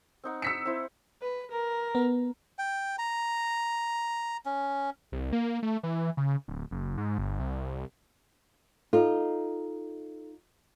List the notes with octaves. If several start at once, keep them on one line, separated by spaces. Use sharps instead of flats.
C4 D#4 F#5
E6 B6 C#7
C4 E4 C5
B4
A#4
B3
G5
A#5
C#4
C2
A#3
A3
E3
C#3
D1
F#1
G#2
G1
C2
D#4 F4 A4